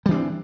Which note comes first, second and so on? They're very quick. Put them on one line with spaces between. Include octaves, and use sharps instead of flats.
G3 E3 D4 C4